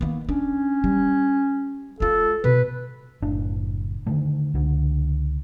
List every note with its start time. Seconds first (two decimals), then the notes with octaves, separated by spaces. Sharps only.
0.01 D#3 A#3 B3
0.29 C#4 D4
0.84 G3
2.00 G#3 F4 A4
2.44 B2 B4
3.22 F#1 A2 D4
4.07 D3 D#3 A3
4.54 C#2 D3